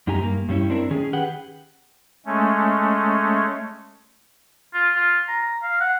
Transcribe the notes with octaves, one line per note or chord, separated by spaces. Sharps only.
F#2 D#4 G4 G#5 A#5
G2 A#3
G2 G3 C#4 E4
C4 D4 E4 A#4
D#3 C#4 G#4
G4 G#4 B4 F#5 G5
G#3 A3 C#4
F4
F4
A#5
F5
F#5